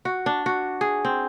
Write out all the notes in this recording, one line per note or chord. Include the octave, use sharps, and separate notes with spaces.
F#4
D4
F#4
G#4
C4